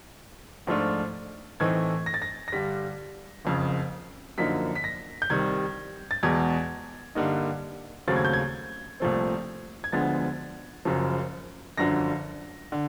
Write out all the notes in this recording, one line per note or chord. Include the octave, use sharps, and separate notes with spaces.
G#2 F3 A3 D4 F4
A2 E3 A3 C4 D#4 G#6
A#6
A6
A#6
A#6
G2 D3 G3 B6
F#1 F2 C#3
F#2 D3 F3 A#3 D#4 B6
B6
A#6
G6
C2 C3 D#3 G3 G#6
A6
E2 B2 G#3 G#6
G2 D3 G3 A#3 D#4
D#2 C#3 F#3 A3 C4 A6
G#6
G6
G#6
C2 A#2 F3 A3 C4
G#6
D2 D3 F3 G#3 B3 A6
F#1 F#2 C#3 F3
G1 F#2 D3 F3 A#6
D3